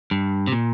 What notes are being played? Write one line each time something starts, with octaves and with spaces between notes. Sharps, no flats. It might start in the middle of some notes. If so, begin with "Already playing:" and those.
G2
C3
A#2